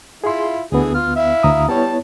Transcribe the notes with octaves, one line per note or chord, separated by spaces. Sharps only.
E4 F4 G#4 C6
D2 D3 E3 B3 G#4
F4 F6
E4 E5 F5
D2 A#5 D#6
G3 B3 E4 C#5 A5